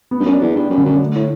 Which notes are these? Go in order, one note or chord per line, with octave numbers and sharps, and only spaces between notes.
B3
G2
F#2
D4
E2
G2 G3
F#2
D3
F#2
A3
A2